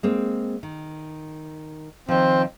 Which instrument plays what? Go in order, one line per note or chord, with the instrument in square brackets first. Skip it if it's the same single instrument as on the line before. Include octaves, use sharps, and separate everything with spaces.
[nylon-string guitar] G#3 A#3 C4
D#3
[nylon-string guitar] D#3 F3 [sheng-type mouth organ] C4